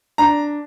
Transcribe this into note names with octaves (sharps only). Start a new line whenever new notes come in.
D4 A#5